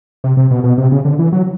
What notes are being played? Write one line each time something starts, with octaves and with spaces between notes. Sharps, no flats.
C3
C3
B2
B2
C3
C#3
D3
E3
F#3